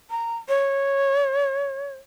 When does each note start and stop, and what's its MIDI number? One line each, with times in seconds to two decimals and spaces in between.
0.10 0.36 82
0.49 1.95 73